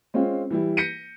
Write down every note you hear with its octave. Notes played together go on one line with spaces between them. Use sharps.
G#3 C4 C#4 F4
E3 G3 E4
G6 A#6 B6 C#7 D#7